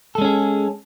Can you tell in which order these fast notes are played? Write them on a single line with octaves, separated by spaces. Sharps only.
A4 G#3 C#4 G#4